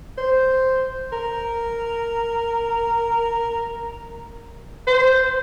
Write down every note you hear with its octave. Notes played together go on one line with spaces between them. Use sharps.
C5
A#4
C5